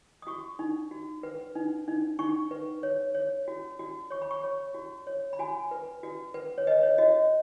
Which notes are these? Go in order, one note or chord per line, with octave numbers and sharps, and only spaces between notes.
D#6
F#4 C#6
D#4
F#4
B4
D#4
D#4
D#4 C#6
B4
C#5
C#5
F#4
F#4
C#5 C#6
B5
C#6
C#5
F#4
C#5
B5
F#4 G#5
B4
F#4
B4
C#5
B4 D#5
C#5
F#4 D#5